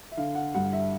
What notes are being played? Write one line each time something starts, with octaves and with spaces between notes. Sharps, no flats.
E5
D3 F5
F#5
G2 F#5
E5